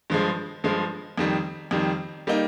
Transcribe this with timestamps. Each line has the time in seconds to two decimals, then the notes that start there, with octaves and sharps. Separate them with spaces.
0.10 G2 F3 G#3
0.64 G2 F3 G#3
1.18 F2 D#3 G3
1.71 F2 D#3 G3
2.27 G3 A#3 D#4